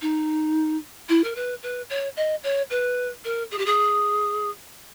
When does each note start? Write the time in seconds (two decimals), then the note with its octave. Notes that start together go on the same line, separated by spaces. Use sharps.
0.01 D#4
1.09 E4
1.24 A#4
1.35 B4
1.63 B4
1.90 C#5
2.16 D#5
2.43 C#5
2.70 B4
3.24 A#4
3.51 G#4
3.58 G4
3.66 G#4